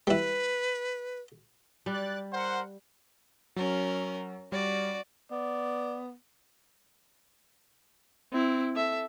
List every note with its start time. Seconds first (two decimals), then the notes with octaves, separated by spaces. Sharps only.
0.07 G3 E4 B4
1.86 G3 D5 F#6 A6
2.32 A#4 C5 F#5
3.56 F#3 C#4 A#4
4.52 G3 F#4 D5
5.31 B3 D5
8.33 C4 E4
8.75 A4 E5